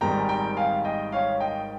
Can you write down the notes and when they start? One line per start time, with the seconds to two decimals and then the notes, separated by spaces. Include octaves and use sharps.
0.01 G#1 G#2 D#3 G3 G5 A#5
0.19 G#5
0.29 G5 A#5
0.57 F5 G#5
0.84 D#5 G5
1.12 C#5 F5
1.40 D#5 G5